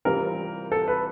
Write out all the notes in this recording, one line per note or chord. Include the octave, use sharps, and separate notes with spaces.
C3 E3 G3 C4 F4 A#4
A4
B4